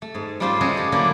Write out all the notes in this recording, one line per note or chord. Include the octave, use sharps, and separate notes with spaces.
A3
G#2
G3 A3 C#4 F4 G4 C5
G#3 A3 C#4 F#4 G#4 A4
G4
D3 F#3 A#3 D4 E4